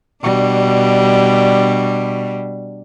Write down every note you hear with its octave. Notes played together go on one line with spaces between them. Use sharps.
B2 G3 D4